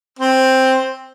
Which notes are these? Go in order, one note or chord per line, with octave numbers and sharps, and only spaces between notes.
C4